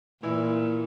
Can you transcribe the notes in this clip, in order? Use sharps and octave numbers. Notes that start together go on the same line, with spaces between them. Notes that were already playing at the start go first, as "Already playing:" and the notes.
A#2 E3 E4